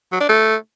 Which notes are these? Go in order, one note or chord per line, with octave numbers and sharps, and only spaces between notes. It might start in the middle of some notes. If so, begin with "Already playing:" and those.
F#3
D4
A3